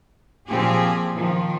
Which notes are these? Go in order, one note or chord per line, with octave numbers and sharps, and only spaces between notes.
A#2 F3 A#3 C4 G4 G#4
D#3 F3